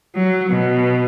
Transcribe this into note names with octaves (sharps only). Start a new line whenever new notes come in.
F#3
B2